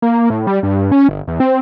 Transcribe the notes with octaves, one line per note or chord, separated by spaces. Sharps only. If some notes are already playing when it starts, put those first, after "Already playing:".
A#3
A2
G3
G2
C#4
G1
E2
C4